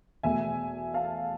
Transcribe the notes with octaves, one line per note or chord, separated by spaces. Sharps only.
E2 B2 A3 E5 G#5
F5 A5